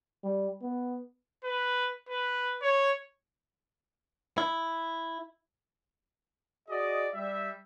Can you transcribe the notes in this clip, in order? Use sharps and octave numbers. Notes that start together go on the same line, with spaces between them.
G3
B3
B4
B4
C#5
E4
F#4 G#4 D5 D#5
G3 E5